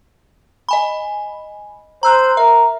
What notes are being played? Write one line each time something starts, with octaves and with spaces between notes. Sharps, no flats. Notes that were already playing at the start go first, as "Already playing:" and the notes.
D#5 G#5 B5
C5 A#5 E6 F#6
A#4 E5